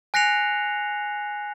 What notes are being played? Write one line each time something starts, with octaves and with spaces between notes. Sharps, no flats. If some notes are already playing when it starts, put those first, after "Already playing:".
G#5 F#6 A#6 C7 C#7 F7